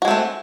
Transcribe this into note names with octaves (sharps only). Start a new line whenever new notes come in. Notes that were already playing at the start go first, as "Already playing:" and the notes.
G#3 A3 C4 F#4